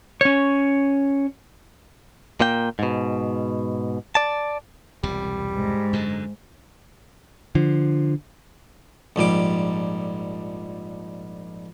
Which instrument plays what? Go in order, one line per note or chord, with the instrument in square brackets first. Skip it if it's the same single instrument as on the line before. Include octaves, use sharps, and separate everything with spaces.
[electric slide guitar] C#4 C#5
[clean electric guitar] A#2 A#3 G5
G#2 B2
D5 A5
[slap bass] E1 C2 A#2 [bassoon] G3
[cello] G#2
[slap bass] F#2 D3
[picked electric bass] D3 F3
[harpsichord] A#1 G#2 G3 D6